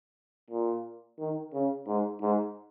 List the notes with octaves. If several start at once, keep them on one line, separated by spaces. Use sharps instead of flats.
A#2
D#3
C#3
G#2
G#2